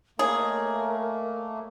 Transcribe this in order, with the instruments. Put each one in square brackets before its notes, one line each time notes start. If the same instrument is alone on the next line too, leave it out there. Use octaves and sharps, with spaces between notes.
[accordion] A3 A#3 [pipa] G#4 [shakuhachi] A#4 [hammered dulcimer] C#5 D#5 G#5